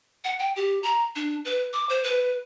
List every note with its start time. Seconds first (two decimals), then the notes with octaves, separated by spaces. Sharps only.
0.24 F#5
0.39 G5
0.56 G4
0.83 A#5
1.16 D4
1.45 B4
1.73 D6
1.89 C5
2.04 B4